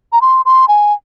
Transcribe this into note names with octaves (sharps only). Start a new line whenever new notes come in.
A#5
C6
C6
G#5